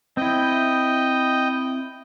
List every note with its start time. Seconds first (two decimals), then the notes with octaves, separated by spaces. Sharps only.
0.17 C4 E4 D#5 G5